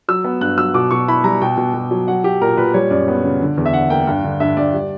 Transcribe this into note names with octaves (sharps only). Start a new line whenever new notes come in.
F#3 E6
B3
G2 F#6
F#3 E6
B2 D6
B2 C#6
E4 B5
G3 A#5
B2 G5
B2
B2
F#3
F#3 F#5
F#3 G4
A#2 A#4
A#2 B4
G3 C#5
F#2 D5
B3
C#3
D3
E2
E5
D3 F#5
A#3 G5
G2
D3
G2 E5
G2 D5
G3